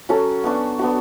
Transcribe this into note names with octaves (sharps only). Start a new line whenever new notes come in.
F#3 C#4 F#4 A4
B3 D4 F#4
B3 D4 F#4